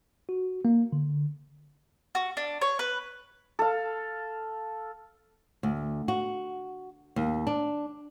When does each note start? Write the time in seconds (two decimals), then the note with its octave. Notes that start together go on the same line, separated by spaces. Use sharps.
0.29 F#4
0.65 A#3
0.92 D3
2.15 F#4
2.37 D4
2.61 C#5
2.79 B4
3.59 A4 F5
5.63 D2
6.08 F#4
7.16 D#2
7.47 D4